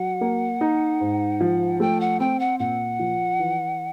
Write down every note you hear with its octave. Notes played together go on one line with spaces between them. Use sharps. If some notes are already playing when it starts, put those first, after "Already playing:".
Already playing: F#3 F#5
A#3
D#4
G#2
F3
A3 G5
F#5
C4 G5
F#5
A#2 F#5
F3
E3